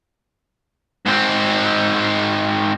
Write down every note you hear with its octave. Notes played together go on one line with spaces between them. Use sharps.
G#2 C4